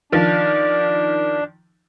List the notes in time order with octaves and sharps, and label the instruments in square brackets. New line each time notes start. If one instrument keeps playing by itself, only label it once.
[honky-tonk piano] D#3 F3 [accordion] D4